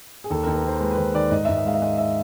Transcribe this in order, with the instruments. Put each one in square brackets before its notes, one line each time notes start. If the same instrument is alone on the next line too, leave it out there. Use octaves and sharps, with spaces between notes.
[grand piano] G#4
D#2 A4
D#2 A#4
B4
D#3 C5
G#3 B4
B4
D#2 C5
D#3 D5
G#2 D#5
G#2 E5
D#5
G#3 F5
E5
G#3 D#5
E5